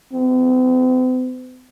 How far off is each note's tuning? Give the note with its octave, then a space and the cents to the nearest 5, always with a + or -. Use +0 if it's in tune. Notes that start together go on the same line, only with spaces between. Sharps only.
C4 -45